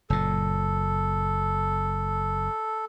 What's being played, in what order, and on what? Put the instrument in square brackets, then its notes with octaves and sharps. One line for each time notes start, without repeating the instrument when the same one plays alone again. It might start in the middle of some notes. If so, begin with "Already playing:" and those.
[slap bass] F#1 A#2 [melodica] A4